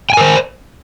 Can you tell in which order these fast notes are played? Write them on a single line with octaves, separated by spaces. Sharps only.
G5 G#5 A#4 C5